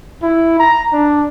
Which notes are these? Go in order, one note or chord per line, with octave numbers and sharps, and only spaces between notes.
E4
A#5
D4